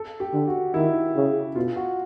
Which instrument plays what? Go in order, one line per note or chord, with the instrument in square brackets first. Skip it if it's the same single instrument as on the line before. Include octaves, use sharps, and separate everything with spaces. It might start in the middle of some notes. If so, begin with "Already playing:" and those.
Already playing: [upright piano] A4
G4
[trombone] D3
[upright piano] F#4
[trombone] D#3 [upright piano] E4
[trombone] C#3
[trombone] B2 [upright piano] F4
[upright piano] F#4